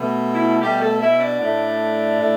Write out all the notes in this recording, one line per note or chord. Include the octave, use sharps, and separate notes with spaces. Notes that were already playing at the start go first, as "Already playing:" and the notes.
Already playing: B2 A3
E4
B2 G3 A3 G4
A3 A4
E4 E5
D4 D5
A2 A3
A2 A3